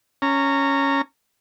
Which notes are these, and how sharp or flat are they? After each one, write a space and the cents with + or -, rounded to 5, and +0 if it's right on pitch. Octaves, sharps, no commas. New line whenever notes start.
C#4 +0 A#5 -20